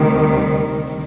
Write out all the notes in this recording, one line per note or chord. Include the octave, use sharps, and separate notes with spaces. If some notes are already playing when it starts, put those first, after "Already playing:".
Already playing: D2 C3 D#3 G3